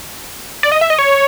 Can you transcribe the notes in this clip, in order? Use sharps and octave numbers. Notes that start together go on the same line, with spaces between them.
D5
D#5
E5
D#5
C#5